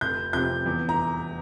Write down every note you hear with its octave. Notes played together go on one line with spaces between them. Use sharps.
F1 G6
F2 C3 G6
E2
A#5